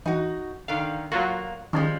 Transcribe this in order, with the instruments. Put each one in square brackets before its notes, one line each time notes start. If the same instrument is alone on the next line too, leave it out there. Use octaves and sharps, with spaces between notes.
[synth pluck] E3 [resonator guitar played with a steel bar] D#4 F#4
[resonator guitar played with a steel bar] D3 D#3 [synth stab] F5
[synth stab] F#3 F4 F#4 [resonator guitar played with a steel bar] A#3
[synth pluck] D#3 C#4 G#4 [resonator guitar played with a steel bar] F3 G3 G#3